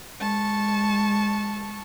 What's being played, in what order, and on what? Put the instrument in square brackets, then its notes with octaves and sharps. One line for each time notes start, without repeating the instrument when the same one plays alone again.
[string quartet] G#3 A5 C#6